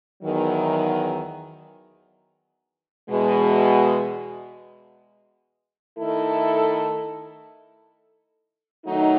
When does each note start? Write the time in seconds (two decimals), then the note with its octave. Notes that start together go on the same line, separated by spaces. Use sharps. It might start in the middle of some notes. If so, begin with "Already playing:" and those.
0.22 E2 D#3 F#3
3.09 E2 B2 G#3
5.98 D#3 A3 E4 A4
8.86 D#3 F#3 A3 D#4